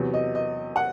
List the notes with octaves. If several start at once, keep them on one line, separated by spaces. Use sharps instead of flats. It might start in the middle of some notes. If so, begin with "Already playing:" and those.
Already playing: E2 C3 F#3
D#5
D#5
F#5